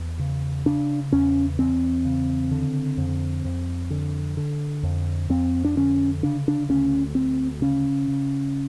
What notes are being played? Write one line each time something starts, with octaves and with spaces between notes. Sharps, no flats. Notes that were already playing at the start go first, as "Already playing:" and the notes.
Already playing: E2
C#3
C#3 D4
E2 C#4
E2 C4
C#3
D3
F2
F2
D3
D3
F2
F2 C4
D4
D3 C#4
C#3 D4
D4
D2 C#4
D2 C4
C#3 C#4
C#3